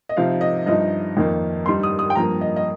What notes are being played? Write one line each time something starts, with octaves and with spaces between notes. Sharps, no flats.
D#5
C3 F3 C4 D#4 F5
D#5
G2 F3 D#4 D#5
F2 D#3 A#3 D#4
G2 G3 D#4 C6
D#6
D#6
G5
G2 F3 A#3 A#5
D#5
D#5